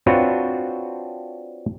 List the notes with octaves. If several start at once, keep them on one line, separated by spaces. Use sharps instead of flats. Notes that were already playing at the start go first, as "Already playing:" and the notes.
C4 D4 F4 F#4 B4 C#5